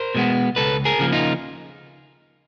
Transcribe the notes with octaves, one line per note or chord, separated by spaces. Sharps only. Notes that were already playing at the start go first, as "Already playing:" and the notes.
Already playing: A#4 C5
B2 G#3 B3
C#2 A4 B4
G#4 A#4
C#3 F3 A#3
D#4 F4